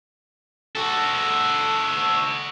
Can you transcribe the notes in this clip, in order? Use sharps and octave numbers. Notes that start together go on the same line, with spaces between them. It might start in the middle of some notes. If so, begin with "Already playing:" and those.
F#4 A4